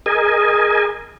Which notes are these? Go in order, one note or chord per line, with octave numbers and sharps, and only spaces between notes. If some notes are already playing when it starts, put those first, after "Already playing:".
G#4 A#4 D#5 G#5